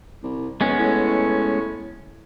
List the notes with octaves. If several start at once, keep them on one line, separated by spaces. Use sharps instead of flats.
C2
E1 G#3 B3 C#4
A2